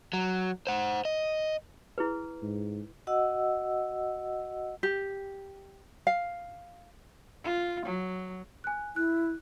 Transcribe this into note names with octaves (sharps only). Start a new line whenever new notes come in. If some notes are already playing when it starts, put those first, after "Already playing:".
F#3
C5 F#5
D#5
E4 G#4 B4
G#2
F#4 D#5 F#5 E6
G4
F5
F4
F#3
G#5 F#6
E4 F#6